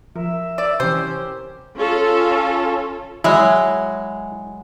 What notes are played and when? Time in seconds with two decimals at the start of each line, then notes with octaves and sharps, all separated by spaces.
0.15 F3 A#4 E5
0.58 D5 E6
0.80 C3 E3 C#4 G4 C5
1.75 C#4 F4 A4
3.24 F#3 G#3 E4